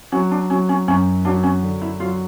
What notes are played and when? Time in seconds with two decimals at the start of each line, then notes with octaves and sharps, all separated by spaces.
0.12 F#3 C#4
0.31 D4
0.50 F#3 C#4
0.69 C#4
0.88 F#2 C#4
1.25 F#3 D4
1.43 C#4
1.63 D3
1.82 E4
2.00 F#3 F4